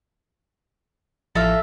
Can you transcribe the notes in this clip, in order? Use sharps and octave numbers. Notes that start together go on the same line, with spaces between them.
A1 F3 A4 E5 F5 A#6